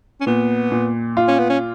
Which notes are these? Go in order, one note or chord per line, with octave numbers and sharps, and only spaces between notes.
C#4
A#2 B3
A#2
F4
C#4
B3
C#4